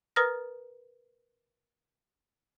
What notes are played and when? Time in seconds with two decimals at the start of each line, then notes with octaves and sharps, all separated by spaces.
0.16 A#4 B4 A#5 D#6 F6 A#6